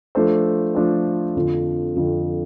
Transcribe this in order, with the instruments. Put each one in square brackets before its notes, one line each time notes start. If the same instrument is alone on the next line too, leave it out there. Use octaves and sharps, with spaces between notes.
[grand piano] F3 A3 D4 A4 C5
F3 A3 D4 A4 C5
F2 D3 F3
F2 D3 F3